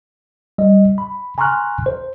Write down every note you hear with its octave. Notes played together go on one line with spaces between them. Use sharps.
G3 D#5
B5
G#5 A#5 C6 C#6 F6 F#6
C5